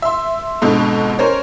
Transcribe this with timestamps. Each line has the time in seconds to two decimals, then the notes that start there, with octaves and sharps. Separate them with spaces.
0.02 E5 C6
0.61 F2 G#2 B2 D3
1.19 C#4 A#4 C5 C#5